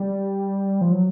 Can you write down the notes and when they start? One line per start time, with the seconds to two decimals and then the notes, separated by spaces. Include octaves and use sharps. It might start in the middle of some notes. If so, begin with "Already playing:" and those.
Already playing: G3
0.81 F3
0.92 F#3